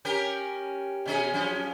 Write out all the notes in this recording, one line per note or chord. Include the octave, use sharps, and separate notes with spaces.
C#4 G4 A#4
B2 C#4 G#4
F#2 F3 C#4